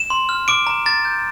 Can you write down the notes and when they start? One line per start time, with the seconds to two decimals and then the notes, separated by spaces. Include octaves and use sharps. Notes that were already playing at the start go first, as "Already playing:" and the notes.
Already playing: E7
0.10 C6
0.29 F6
0.48 D6 D7
0.67 A#5
0.86 A#5 A6
1.05 G6